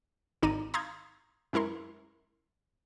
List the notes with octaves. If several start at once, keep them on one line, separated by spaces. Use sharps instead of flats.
G#1 D#4 D5 A#5 D#7
F5 A#5 C6 D#6 G6 G#6
F#2 G#3 E4 A#4 C6